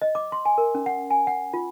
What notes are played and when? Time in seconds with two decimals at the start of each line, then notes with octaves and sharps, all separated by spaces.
0.02 D#5
0.15 D6
0.32 C6
0.45 G#5
0.58 A#4
0.75 C#4
0.86 F#5
1.10 G#5
1.27 F#5
1.54 F4